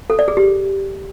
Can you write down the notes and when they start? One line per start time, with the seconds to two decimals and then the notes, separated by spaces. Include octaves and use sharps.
0.10 A4
0.19 D5
0.28 G#4
0.37 G4